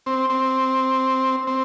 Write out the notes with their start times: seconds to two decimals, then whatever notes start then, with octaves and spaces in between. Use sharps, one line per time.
0.06 C4
0.30 C4
1.47 C4